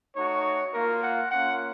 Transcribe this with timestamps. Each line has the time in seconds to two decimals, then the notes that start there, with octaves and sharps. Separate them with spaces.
0.16 A3 D#4 F#4 C#5
0.74 A#3 F4 A#4
1.03 F#5
1.31 A#3 C#4 F4 F#5